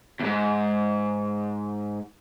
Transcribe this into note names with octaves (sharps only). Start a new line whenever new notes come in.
E2 G#2